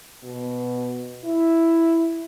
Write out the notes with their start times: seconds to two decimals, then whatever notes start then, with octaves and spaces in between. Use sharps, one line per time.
0.23 B2
1.25 E4